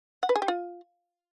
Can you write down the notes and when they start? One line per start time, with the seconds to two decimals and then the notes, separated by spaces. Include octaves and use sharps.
0.23 F#5
0.29 B4
0.36 G#4
0.42 G4
0.48 F4